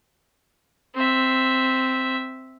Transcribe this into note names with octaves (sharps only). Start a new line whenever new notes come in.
C4 E5